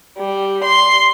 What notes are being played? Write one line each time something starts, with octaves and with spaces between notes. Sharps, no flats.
G3
C6